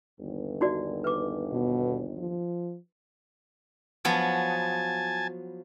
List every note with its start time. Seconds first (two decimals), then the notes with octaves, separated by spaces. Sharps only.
0.19 G1 D#2
0.61 D#4 F#4 D5
1.04 B4 D6
1.52 B2
2.18 F3
4.05 F3 F#3 B3 G#5 A5